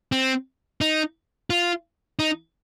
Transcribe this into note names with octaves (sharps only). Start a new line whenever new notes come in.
C4
D#4
F4
D#4